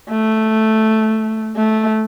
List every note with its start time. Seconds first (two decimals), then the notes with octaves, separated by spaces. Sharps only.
0.10 A3
1.56 A3